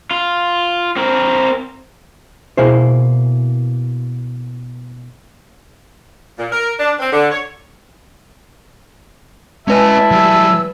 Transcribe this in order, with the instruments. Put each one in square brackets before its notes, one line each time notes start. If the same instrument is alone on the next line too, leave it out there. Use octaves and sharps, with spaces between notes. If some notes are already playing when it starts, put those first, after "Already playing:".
[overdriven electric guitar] F4
C4 A#4
[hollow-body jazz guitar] B2 A#3 E4 G#4 C5
[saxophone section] A#2
A#4
D4
C4
D3
C#5
[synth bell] G#3 B4 G#5 [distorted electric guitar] C#4 D#5 [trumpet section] E4 E5 A5
[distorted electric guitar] F#3 G3 [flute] E6